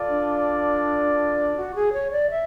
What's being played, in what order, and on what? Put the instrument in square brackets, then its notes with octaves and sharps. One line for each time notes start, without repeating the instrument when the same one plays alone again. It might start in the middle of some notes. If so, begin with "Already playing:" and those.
Already playing: [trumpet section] F4 A4 D5
[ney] D4
F#4
G#4
C#5
D5
E5